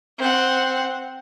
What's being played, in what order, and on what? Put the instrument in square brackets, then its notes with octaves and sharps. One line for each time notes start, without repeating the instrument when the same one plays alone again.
[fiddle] C4 F#5